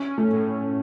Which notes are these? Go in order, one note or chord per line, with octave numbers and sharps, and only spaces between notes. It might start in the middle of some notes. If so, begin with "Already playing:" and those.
Already playing: C#4
A3
A2